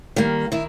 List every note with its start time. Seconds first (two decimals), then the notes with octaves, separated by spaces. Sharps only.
0.16 D#3 G3 A#3
0.52 D#3 E4